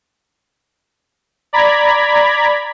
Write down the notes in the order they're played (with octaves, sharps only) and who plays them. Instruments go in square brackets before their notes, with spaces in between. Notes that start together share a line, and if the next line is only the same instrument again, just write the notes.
[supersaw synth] D5 A#5 B5 G#6 B6